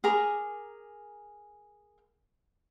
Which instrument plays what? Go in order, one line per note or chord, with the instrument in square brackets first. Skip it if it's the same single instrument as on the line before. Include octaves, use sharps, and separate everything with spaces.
[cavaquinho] G#4 A#4 A#5 D6